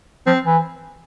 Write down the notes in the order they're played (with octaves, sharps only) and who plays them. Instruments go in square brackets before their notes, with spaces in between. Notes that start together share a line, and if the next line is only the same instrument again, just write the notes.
[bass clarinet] F3 [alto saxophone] C4
[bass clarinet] E3